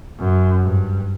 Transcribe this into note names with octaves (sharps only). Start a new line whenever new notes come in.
F#2
G2